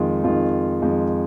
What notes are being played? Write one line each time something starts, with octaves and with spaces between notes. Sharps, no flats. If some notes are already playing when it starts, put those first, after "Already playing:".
Already playing: F2 D#3 G#3 F4
F2 D#3 G#3 F4
F2 D#3 G#3 F4